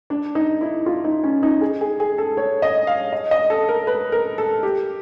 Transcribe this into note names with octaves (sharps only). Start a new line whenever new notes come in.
D4
D#4
E4
F4
D#4
C#4
D#4
G#4
G#4
G#4
A4
C#5
D#5
F5
D#5
D#5
A4
A#4
B4
A#4
A4
G4